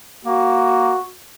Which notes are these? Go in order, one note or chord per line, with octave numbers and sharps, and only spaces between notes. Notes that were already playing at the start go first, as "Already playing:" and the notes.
A#3 F#4